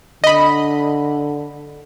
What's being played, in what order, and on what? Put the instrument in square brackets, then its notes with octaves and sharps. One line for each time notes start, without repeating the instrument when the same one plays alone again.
[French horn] D3 [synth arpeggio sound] D#5 B5